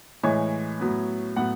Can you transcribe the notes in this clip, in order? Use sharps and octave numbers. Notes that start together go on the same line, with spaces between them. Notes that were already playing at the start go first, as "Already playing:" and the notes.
A2 E3 G#3 C#5
A2 F#3 B3
A2 F#3 B3 F#5